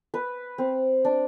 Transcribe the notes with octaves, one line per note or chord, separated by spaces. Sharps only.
B4
C4
D4